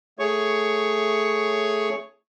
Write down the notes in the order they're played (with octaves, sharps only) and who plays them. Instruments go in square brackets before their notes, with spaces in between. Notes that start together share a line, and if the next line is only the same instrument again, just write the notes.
[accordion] A3 G#4 C#5 C#6